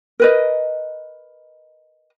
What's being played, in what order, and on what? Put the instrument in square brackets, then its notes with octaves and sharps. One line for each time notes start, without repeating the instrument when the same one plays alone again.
[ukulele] A#4 B4 D#5